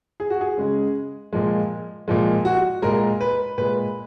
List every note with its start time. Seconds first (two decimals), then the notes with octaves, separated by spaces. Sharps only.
0.20 G#4
0.30 F#4
0.41 G#4
0.57 C#3 G#3
1.33 A#2 F3 G#3
2.08 A#2 F3 G#3
2.45 F#4
2.82 A#2 G#3 A#4
3.21 B4
3.58 A#2 G#3 B4